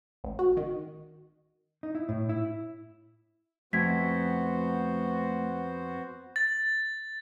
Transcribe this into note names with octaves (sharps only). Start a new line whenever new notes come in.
A1
F#4
D#3
D#4
E4
A2
E4
F2 A3 B3 F#4 C5 G#6 B6
A6